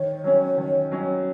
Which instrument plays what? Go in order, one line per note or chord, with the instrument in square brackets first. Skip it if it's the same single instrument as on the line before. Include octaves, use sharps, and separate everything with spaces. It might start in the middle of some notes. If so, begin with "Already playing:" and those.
Already playing: [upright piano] D#3 [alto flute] C#5
[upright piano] F#3 C#4
D#3
F#3 C#4